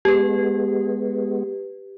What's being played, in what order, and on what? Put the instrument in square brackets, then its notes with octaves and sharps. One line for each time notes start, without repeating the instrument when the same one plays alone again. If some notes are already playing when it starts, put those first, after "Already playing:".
[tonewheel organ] G#3 B3 [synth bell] G4 B4